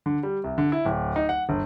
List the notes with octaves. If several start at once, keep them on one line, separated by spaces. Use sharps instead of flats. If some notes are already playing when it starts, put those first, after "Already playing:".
D3
G3
C2
D3
E4
D1
D#4
F#5
G1